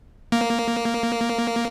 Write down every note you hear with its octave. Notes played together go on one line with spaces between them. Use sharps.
A#3